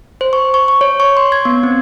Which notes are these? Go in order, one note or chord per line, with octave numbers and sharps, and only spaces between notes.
C5
C#6
C#6
C#6
C#5
C#6
C6
G#6
B3
C4